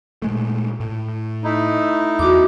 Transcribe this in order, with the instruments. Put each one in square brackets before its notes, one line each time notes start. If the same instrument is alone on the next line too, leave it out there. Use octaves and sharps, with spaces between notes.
[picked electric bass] A#2 G#3 A3
A2
[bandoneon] A3 D#4 E4
[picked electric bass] E2 [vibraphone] F#4 D6